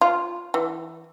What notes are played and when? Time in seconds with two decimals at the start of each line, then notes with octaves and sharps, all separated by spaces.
0.01 F4
0.54 E3